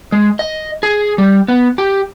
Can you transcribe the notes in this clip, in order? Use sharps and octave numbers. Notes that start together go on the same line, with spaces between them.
G#3
D#5
G#4
G3
B3
G4